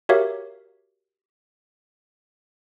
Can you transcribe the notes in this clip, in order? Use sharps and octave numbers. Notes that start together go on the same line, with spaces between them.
F#4 G4 A#4 C#5 E5 F5